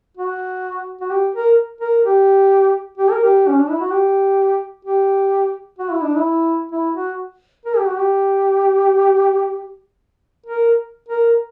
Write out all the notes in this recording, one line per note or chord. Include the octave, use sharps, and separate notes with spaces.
F#4
F#4
G4
A#4
A#4
G4
G4
A#4
G4
C#4
D4
E4
F#4
G4
G4
F#4
E4
D4
E4
E4
F#4
A#4
G4
F#4
G4
A#4
A#4